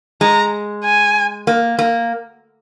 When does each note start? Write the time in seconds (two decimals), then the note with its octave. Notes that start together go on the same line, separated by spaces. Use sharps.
0.21 G#3 A#5
0.84 G#5
1.47 A#3
1.79 A#3